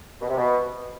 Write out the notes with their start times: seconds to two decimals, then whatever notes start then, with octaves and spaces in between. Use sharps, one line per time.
0.21 B2
0.30 C3
0.38 B2